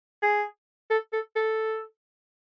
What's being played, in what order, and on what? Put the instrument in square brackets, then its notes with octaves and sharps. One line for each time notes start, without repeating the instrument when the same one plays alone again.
[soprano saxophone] G#4
A4
A4
A4